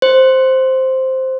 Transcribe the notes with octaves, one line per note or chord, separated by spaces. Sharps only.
C5